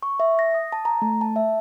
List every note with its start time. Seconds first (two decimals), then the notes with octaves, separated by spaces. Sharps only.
0.03 C#6
0.20 E5
0.39 A#6
0.54 D#6
0.72 A5
0.85 A#5
1.02 A3
1.21 A5
1.36 E5